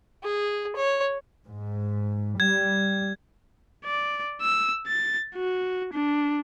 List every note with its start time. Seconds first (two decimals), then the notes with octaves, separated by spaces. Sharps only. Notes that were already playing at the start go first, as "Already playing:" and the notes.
0.24 G#4
0.76 C#5
1.46 G#2
2.40 G3 G#6
3.85 D5
4.42 E6
4.87 A6
5.36 F#4
5.94 D4